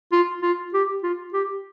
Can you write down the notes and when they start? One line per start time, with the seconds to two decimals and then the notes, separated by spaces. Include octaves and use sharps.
0.12 F4
0.43 F4
0.74 G4
1.03 F4
1.34 G4